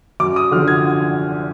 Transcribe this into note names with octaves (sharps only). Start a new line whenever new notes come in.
F#2 D6
D#6
D3 F3 F6
G#6